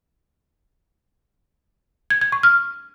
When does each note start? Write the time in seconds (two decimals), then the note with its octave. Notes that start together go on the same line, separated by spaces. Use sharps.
2.10 G#6
2.21 G#6
2.32 C#6
2.43 F6